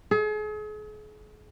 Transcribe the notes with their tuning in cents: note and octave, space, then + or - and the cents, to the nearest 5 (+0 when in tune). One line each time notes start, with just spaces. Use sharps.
G#4 +40